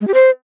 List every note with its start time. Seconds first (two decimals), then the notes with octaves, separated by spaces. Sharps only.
0.01 G#3
0.08 G4
0.14 C5